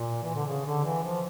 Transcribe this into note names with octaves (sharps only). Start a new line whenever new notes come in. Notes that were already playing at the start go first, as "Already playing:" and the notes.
Already playing: A#2
E3
D3
C#3
D3
E3
F3